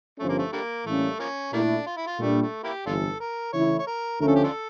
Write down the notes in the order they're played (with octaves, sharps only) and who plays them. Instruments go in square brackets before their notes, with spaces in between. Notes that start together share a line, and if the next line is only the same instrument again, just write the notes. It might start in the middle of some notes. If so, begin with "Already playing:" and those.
[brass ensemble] G1 G2 F3 C#4 [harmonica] A3
[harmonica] A#3
A3
D3 G3 A#3
[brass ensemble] A2 E3 G3 A#3 C#4 [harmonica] A3
[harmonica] F3 A#3 C#4
[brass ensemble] A#2 A3 E4 [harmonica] G3 A#3 D4
[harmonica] F4
E4
F4
[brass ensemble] A#2 G3 D4 [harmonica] A3
[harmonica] A3
A#3 E4 G4
[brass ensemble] G1 F2 E3 [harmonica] D4 F4 A4
[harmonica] A#4
[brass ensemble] C#3 E3 A3 E4 [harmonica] C#5
[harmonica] C#5
A#4
[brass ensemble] D2 D3 F3 A3 C#4 [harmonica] A#4
[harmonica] A4
G4
D4 F4 A4